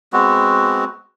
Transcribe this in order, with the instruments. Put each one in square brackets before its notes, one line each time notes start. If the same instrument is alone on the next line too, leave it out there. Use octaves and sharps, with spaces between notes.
[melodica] G#3 B3 C4 F#4